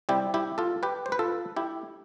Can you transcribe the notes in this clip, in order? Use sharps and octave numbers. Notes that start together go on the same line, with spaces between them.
C3 G3 C4 E4 G4
E4 G4
F4 A4
G4 B4
C5
B4
F4 A4
E4 G4